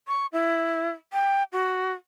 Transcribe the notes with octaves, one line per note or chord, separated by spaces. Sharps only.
C#6
E4
G5
F#4